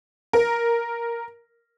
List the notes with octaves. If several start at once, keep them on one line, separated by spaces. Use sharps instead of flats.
A#4